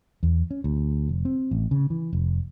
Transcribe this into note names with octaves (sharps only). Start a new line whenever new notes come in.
E2
C#4
D2
F1
C4
A1
C#3
E3
F1